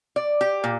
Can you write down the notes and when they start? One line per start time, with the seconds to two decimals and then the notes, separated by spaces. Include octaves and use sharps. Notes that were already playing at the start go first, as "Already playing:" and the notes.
0.16 D5
0.41 G4
0.64 A#2